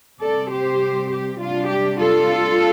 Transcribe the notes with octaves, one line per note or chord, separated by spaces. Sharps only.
C3 G3 C4 A4 D5
G4 C5
G4
C3 G3 D4 F4
G4
F4 A4